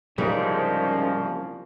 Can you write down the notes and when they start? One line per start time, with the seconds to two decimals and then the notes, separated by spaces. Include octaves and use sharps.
0.18 C2 G#2 C#3 F3 G3 A#3 C#4 D5